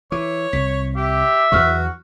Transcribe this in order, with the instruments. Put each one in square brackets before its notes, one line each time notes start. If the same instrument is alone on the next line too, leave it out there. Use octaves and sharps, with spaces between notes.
[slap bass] E3 [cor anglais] C#5 [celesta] D6
[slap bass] C2 [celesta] B6
[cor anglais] G4 [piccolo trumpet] E5
[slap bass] E2 E3 F#3 [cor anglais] F#4 [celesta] C#6 F6 F#6